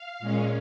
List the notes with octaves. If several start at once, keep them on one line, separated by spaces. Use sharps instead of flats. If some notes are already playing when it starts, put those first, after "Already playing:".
Already playing: F5
A#2 G#3 C#4